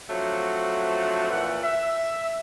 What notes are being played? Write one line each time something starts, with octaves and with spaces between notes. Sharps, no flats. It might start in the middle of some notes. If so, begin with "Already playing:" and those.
F3 F#3 A3 C4 D4 F#4
A#2 E3 A3 F#5
E5